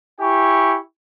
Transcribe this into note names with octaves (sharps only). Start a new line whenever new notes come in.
E4 G4 G#5 C#6